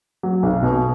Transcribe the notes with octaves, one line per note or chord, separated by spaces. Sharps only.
F#3
B1
B2